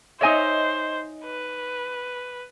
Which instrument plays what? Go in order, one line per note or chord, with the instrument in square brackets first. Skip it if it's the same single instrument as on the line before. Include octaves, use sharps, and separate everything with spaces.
[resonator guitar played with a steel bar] D#4 E5 [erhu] C5 [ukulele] C#5 D#5 G#5
[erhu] B4